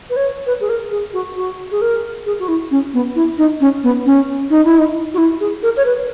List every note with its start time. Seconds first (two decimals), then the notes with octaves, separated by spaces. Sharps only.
0.10 B4
0.16 C#5
0.47 B4
0.61 G#4
0.69 A#4
0.91 G#4
1.14 F#4
1.37 F#4
1.72 G#4
1.82 A#4
2.26 G#4
2.40 F#4
2.48 E4
2.71 C#4
2.94 B3
3.16 E4
3.38 D#4
3.61 C#4
3.83 B3
4.06 C#4
4.50 D#4
4.65 E4
4.78 D#4
5.14 F#4
5.18 E4
5.40 G#4
5.63 A#4
5.77 C#5
5.85 B4